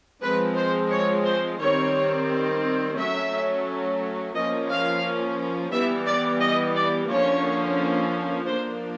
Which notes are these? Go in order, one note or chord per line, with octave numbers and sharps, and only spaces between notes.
F3 G#3 C4 B4
C5
C#5
C5
D#3 G3 C4 C#5
F#3 A3 C#4 E5
F3 A#3 C#4 D#5
F5
E3 G3 B3 E5
D5
D#5
D5
D3 F3 A#3 C#4 C#5
F3 A#3 D4 C5